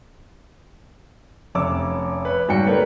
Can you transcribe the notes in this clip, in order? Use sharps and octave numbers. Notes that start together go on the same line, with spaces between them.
F1 C#4 C#5 D6 E6
B4 C#5
G#2 G3 F#4 G5 C#7
A3 A#3 B4 C#5 D5